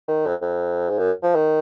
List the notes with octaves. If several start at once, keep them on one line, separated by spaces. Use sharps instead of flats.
D#3
F2
F2
G#2
F#2
F3
D#3